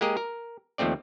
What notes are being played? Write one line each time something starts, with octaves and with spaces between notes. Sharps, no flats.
G#3 A#3 G4 G#4 A#4 D#5
A#4
D#2 F3 A3 C4 D5